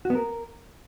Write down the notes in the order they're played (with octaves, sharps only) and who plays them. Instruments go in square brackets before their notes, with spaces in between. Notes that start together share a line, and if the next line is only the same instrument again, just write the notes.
[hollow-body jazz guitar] F#4
B3
A#4